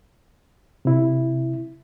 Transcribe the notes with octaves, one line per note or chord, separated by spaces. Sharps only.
C3 E4